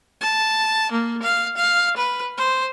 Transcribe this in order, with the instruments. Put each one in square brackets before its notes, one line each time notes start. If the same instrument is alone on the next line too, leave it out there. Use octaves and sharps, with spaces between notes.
[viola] A5
A#3
F5
F5
B4
C5